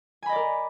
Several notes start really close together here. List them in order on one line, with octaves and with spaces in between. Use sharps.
G#5 B5 D#5 D5 A#4